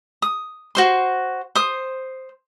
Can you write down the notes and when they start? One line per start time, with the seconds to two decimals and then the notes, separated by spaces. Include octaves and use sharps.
0.22 D#6
0.75 F#4 C5 C6
1.55 C5 D#6